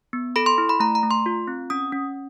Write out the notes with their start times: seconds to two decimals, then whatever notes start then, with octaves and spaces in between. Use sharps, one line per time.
0.13 B3
0.36 A4 B5
0.46 C6
0.58 E4
0.69 B5
0.80 A3 A#5
0.95 A#5
1.03 A3
1.11 C6
1.26 F4
1.48 C4
1.70 C#4 D#6
1.92 C#4